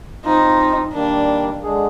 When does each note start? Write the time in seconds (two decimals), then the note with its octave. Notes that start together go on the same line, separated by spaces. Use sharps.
0.25 F3 C4 D#4 F4
0.94 D#3 G3 A#3 D4
1.64 D3 G#3 D4 G#4